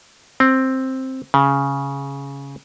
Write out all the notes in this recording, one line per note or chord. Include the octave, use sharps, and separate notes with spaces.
C4
C#3